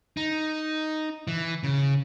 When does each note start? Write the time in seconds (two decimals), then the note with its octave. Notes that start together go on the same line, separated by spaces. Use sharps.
0.17 D#4
1.28 E3
1.63 C#3